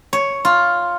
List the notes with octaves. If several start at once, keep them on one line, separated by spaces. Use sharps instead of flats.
C#5
F4